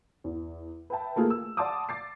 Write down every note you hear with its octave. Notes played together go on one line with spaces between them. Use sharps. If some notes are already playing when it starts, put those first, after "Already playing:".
E2
B4 E5 G5 A5
A3 A#3 F4 G#4 A#4
E6
D5 F#5 A5 C6 D6 D#6
D6 A6 C7